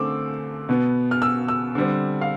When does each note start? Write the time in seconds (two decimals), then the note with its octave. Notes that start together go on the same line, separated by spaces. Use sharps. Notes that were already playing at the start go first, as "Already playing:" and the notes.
Already playing: D3 A3 C4 D6 E6
0.69 B2 B3
1.11 F6
1.22 E6
1.48 E6
1.75 D3 G3 C4
2.21 F5